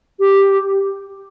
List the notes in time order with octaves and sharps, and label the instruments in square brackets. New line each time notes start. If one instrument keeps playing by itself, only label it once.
[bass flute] G4